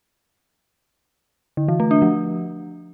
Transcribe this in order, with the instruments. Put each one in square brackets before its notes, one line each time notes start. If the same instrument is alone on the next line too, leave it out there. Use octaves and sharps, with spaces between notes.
[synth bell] D3
E3
A3
D4
F3